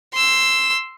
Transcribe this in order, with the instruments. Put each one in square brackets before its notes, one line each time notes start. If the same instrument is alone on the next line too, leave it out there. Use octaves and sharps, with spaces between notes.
[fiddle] C6 E6